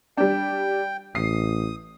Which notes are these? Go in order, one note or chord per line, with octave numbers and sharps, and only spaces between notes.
G3 D4 G5
A1 D#6 C7